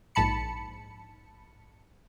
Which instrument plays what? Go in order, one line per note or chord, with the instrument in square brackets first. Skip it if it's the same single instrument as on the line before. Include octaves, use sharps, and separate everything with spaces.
[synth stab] A#1 G#2 A5 B5 C#7